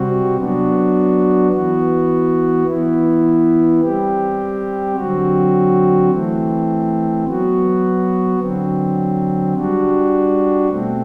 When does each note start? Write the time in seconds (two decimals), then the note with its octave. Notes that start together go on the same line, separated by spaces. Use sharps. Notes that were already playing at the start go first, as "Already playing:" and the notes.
Already playing: C3 G3 C4 F#4
0.37 F#3 B3 D4 F#4
1.51 E3 B3 F#4
2.66 E3 B3 E4
3.81 G3 C4 G4
4.96 D3 F#3 C4 F#4
6.10 E3 A3 C4
7.25 F#3 B3 F#4
8.39 D3 F#3 C4
9.54 G3 D4 F#4
10.69 B2 A3 C4